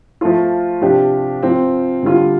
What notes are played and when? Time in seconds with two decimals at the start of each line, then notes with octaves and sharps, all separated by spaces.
0.21 F3 A3 F4
0.81 C3 F3 D4 G4
1.43 F3 C4 F4
2.03 D3 G3 F4